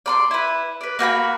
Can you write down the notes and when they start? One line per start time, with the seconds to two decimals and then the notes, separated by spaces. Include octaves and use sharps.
0.06 D5 B5 C6
0.31 E4 B4
0.81 B4 D5
0.99 A#3 F#4 G5 B5